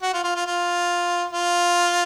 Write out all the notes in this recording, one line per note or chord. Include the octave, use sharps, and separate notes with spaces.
F#4
F4
F4
F4
F4
F4